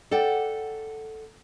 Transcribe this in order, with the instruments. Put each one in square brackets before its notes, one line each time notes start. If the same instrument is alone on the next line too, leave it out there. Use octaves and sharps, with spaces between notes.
[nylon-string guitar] A4 D5 F#5 G5